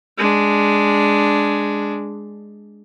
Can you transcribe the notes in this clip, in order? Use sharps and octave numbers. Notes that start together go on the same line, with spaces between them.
G#3 D4